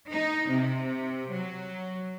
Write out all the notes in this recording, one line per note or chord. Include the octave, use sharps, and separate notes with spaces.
D#4
C3
F#3